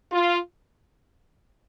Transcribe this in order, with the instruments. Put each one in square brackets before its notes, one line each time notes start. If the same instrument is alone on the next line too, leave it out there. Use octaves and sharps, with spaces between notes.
[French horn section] F4